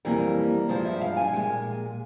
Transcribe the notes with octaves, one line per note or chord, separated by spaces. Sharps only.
F2 E3 G3 A#3 A#4
G2 F3 G#3 C5
E5
F5
G#5
A#2 G#3